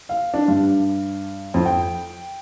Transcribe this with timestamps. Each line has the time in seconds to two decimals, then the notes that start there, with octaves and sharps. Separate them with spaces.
0.09 F5
0.34 D4
0.48 G2
1.54 F2
1.66 G5